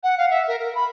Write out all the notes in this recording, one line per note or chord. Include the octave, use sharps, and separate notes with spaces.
F#5
F5
E5
A#4
A#4
B5